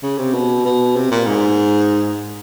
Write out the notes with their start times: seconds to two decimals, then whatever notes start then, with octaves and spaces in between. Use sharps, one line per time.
0.03 C#3
0.18 C3
0.34 B2
0.65 B2
0.96 C3
1.11 A#2
1.27 G#2